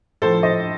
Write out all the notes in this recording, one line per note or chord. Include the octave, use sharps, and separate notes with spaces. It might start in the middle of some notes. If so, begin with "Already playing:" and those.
A2 F3 A4 C5
C5 D#5